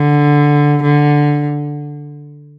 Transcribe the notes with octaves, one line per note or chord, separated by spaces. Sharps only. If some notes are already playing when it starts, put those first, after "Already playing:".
Already playing: D3
D3